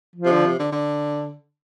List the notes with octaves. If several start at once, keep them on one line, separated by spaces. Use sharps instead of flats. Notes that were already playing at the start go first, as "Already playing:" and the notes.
F3
C3
D3
C3
D3
D3